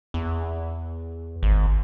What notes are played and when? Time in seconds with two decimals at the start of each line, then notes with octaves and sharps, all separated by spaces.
0.14 E2
1.43 G#1